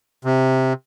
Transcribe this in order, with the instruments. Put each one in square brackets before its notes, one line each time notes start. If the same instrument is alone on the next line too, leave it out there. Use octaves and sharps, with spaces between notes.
[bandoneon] C3